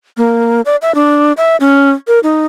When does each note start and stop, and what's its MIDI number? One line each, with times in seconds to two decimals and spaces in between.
0.17 0.61 58
0.65 0.76 74
0.82 0.94 76
0.95 1.33 62
1.37 1.56 76
1.60 1.91 61
2.08 2.20 70
2.23 2.46 63